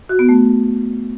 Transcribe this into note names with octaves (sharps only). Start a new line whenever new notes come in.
F#4
B3
A3